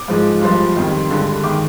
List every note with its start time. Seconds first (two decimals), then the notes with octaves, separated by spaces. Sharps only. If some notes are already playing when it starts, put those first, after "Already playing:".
Already playing: D6
0.08 G#2 F3 G#3
0.41 G2 F3 G#3 C6
0.76 F2 D#3 G3
1.10 G2 D3 G#3
1.43 D#3 G#3 D6